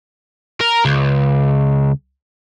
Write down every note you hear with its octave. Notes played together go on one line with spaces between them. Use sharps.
A#4
C#2